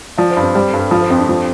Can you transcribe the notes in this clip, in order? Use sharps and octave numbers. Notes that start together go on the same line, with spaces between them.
F3 D5
C5
G2
C4
G3 C5
A4
G2
G4
F3 A4
C5
F2 C4
D4
F3 C4